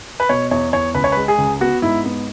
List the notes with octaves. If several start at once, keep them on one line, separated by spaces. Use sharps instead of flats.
B4
B2 C#5
E2 C#5
E2 C#5
C#2 B4
C#5
G#3 B4
G#4
C#2
B3 F#4
G#2 E4
B3